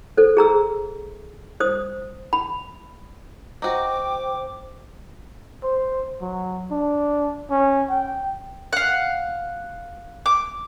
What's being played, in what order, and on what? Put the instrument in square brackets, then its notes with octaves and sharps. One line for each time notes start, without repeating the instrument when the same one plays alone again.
[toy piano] A4 C5
G#4 A#5 E6
C5 D#6
B5
[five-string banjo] D#4 F#4 [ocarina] C5 [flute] G5 [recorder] D6
[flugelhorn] C5
F#3
D4
C#4
G5
[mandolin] F5 F#5
D6